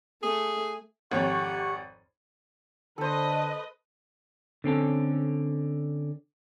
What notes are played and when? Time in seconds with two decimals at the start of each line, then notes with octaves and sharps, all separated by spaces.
0.23 A3 G#4
1.12 G#1 F2 G4 C#5 F#5 C#6
2.98 D3 A4 B4 C5 D#5 A5
4.64 D3 C4 C#4 A4